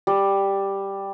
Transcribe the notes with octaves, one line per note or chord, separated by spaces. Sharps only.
G3